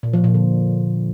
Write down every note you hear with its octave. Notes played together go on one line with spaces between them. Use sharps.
A#2
F3
A#2
D3